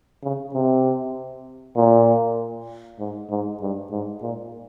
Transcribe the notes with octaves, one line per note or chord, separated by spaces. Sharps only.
C#3
C3
A#2
G#2
G#2
G2
G#2
A#2